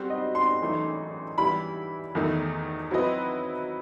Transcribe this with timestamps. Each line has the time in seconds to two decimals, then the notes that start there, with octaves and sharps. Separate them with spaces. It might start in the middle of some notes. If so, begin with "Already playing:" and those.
Already playing: G3 C4 F#4 C5
0.10 D#5
0.35 C6
0.60 F#2 E3 A3 D#4
1.38 E3 G3 B3 E4 B5
2.15 E2 D#3 A3 D#4
2.91 F#3 C4 E4 B4 D#5